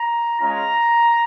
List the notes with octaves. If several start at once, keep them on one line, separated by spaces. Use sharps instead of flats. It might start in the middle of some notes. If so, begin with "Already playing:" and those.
Already playing: A#5
G#3 C#4 F4 A#5